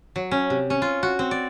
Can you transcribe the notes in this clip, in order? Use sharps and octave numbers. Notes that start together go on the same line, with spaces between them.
F#3
C#4
C3
C#4
F4
F#4
C4
D5